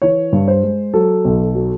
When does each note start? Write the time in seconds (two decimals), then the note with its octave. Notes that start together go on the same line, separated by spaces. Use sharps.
0.02 E3 C#5
0.32 G2
0.48 C5
0.63 G#3
0.94 F#3 A4
1.25 B1
1.55 F#3